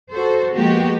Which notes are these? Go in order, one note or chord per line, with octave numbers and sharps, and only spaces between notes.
F#4 A4 C5
F3 G#3 A#3 B3 F#4 G4